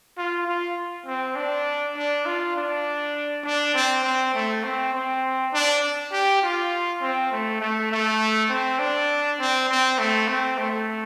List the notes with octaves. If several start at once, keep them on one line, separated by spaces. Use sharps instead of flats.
F4
F4
C4
D4
D4
F4
D4
D4
C4
C4
A3
C4
C4
D4
G4
F4
C4
A3
A3
A3
C4
D4
C4
C4
A3
C4
A3